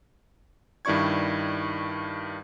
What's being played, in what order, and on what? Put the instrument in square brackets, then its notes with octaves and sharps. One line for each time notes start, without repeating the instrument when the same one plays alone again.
[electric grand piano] G2 D#3 E4 D5 C#6 G#6